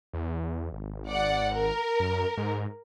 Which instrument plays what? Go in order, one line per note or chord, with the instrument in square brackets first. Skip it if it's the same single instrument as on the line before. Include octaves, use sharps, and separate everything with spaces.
[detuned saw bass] E2
G#1
[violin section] D5 F#5
A#4
[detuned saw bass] F#2
G#2